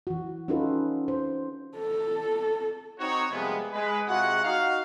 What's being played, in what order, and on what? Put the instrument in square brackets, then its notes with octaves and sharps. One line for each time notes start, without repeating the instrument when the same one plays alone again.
[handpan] E3 F#4
C#4 D#4 F4 F#4 A4 B4
C5
[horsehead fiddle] A4
[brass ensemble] C4 D#4 F#4 C#5
C3 F3 G3 G#3 A#3 B3
G#3 B4
C3 G#3 F4 F#4 F#5
D#4 F#4 F5